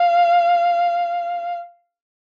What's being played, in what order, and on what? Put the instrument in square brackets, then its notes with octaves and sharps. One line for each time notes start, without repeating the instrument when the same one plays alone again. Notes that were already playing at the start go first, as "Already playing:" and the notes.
Already playing: [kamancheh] F5